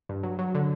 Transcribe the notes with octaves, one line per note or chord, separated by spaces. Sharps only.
G2
F#3
F#3
D3